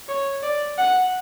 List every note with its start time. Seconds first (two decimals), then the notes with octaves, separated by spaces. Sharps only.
0.08 C#5
0.43 D5
0.78 F#5